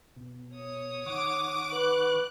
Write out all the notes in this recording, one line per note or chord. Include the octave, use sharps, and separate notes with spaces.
B2
C#5 D#6
D#3 F#5 C#6 D6
B4 F#6